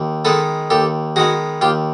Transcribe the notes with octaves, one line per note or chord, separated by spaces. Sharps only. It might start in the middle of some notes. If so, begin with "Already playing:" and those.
Already playing: D#2
D#3 G#3 B3 A4 B4
D#2 G4 A4
D#3 G#3 B3 F#4 G#4
D#2 F4 G4